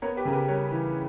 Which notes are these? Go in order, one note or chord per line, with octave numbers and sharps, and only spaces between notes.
B3 A#4 C#5
G4 B4
C#3 A#4
G4 B4
G3 A#4 C#5
E3